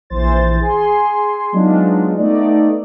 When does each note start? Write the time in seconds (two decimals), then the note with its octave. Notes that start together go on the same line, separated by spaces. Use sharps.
0.10 A#1 E3 C5 A6
0.60 G#4 G#5 C6
1.53 F#3 G#3 B3 D4 D#4 F4
2.18 A3 B3 D#4 D5